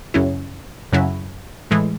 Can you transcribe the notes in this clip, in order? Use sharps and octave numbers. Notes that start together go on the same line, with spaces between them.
F#2 C#3 F#3 C#4 E4
F#2 C#3 F#3 C#4 E4
A2 E3 G#3